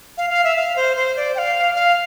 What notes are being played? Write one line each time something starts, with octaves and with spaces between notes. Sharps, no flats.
F5
F5
E5
F5
C5
C5
D5
G5
F5
F5